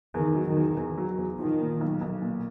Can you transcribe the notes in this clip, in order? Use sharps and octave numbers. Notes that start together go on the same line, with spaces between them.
E2 D#3
F#3
D#3
E2
E2
F#3
E2
D#3 F3
A#2
B1
B1
A#2